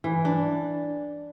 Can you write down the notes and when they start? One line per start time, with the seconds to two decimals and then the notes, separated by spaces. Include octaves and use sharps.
0.04 E3
0.25 D4